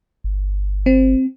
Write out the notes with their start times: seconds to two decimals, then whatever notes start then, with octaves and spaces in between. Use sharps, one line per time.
0.24 G1
0.86 C4